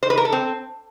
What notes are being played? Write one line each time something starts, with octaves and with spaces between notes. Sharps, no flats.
C5
B4
A#4
A4
C4